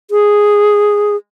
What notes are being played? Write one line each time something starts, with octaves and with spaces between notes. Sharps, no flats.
G#4